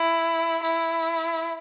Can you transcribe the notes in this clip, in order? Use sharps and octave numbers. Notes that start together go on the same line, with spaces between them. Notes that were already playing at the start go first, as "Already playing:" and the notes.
Already playing: E4
E4